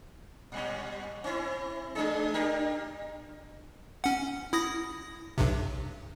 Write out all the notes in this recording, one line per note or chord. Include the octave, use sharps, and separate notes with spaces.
A#2 G3 C#4
C4 E4
G#3 D4 G#4
D4 G4 A#4
C#4 F#5
E4 D#6 A#6
B1 G2 C3